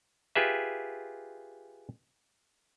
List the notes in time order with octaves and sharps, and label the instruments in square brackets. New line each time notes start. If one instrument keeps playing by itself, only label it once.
[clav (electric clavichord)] F4 G4 G#4 B4 E5